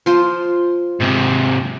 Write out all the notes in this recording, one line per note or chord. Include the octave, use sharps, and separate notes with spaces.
F3 F4 C5
G#2 C3